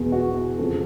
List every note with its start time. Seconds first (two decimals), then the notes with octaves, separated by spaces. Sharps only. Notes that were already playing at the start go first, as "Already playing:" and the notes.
Already playing: E2 B2 G#3 B3
0.12 F#4
0.58 F2 C#3 F3 G#3 C4 A4